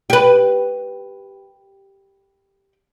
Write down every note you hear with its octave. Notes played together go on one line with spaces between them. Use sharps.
G4 B4